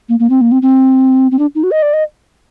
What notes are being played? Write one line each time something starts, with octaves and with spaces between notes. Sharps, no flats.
A#3
A#3
C4
A#3
C4
C4
C4
D4
D#4
F#4
D#5
D5
D#5